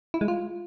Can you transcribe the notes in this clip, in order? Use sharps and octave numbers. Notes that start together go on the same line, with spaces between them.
E4
G#3
F4